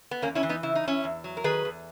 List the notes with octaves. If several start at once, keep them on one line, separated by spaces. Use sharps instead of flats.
B3
E2 A#3 C#4
C#4 E4
E3
B3 D#4
C#3 E4
D#4
E2 C#4 E4
E2
F#3
A#4
D#3 G#4 B4
E2